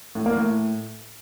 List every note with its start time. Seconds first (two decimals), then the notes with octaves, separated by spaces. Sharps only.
0.15 A2
0.26 A#3
0.36 A2